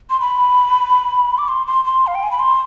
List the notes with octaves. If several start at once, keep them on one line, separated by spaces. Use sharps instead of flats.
C6
B5
D6
C6
C6
C6
F5
G5
G#5
B5
C6